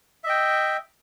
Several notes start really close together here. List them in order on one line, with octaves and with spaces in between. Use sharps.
E5 D#5 G5